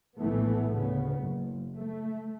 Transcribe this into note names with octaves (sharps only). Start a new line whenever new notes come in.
A#1 A2 E3 A3 B3
D2 C#3 B3
F#1
A3